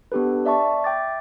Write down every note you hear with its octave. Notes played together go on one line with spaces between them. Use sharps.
B3 D4 G4 A4 B4
D5 E5 A5 C#6
E5 G5 D6 A6